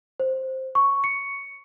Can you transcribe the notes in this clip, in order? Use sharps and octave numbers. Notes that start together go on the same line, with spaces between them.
C5
C#6
C#7